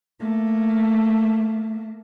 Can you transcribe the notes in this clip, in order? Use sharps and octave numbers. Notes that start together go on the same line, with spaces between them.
A3 A#3